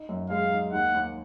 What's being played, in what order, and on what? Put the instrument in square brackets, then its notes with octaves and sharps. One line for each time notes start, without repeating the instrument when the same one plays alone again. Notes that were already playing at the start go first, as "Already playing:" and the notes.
Already playing: [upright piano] D#4
F#2
[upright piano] G#3 [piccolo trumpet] F5
[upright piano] D#4
[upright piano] D#2 [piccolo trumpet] F#5
[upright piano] D#2